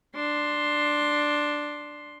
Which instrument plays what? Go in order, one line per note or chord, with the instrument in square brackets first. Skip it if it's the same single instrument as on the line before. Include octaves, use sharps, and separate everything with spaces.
[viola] D4 C6